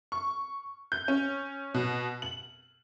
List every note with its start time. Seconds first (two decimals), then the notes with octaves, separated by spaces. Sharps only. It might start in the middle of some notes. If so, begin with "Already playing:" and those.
0.12 C#6
0.92 G6
1.08 C#4
1.74 B2
2.22 F#7